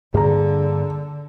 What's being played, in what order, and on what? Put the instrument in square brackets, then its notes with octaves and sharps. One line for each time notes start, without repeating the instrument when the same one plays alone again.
[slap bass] G2 A#3 [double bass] D3 [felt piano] G#4 A#5